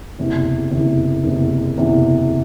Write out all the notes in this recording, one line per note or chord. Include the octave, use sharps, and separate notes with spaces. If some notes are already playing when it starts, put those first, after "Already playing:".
F#1 E2 C3
F#1 E2 C3
F#1 E2 C3
F#1 E2 C3